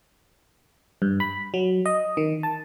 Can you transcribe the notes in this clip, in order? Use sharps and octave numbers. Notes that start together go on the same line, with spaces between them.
G2
B5
F#3
D#5
D#3
A5